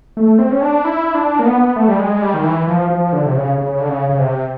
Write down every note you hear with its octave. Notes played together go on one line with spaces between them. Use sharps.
A3
C4
C#4
D4
E4
D4
A#3
B3
A3
G3
G#3
G3
D#3
E3
F3
F3
D3
C3
C#3
C#3
D3
C#3
C#3
C3